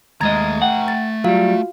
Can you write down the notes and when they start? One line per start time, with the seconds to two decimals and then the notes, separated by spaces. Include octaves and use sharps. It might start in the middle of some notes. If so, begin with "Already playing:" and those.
0.21 D#2 G#3 A3 D#5 A#5 G#6 A6
0.62 F#5 G5
0.88 A6
1.24 F#3 G3 F4 F#4 F5